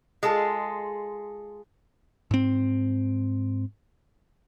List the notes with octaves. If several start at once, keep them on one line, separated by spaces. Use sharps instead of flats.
G#3 F4 G#4 A4
G#2 C4